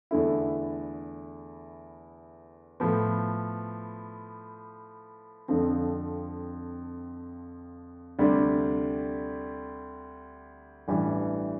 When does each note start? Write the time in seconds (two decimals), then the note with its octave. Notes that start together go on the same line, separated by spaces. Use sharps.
0.11 E2 D3 A3 E4
2.80 A2 F3 B3
5.48 F2 D3 F3 C4
8.19 D2 C3 G3 D4
10.88 A1 G2 E3 G3